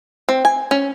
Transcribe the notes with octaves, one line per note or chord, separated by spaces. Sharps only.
C4
G#5
C#4